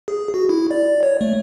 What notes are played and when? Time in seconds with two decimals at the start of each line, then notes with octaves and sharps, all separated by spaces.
0.08 G#4
0.34 F#4
0.49 E4
0.71 D5
1.03 C#5
1.21 A3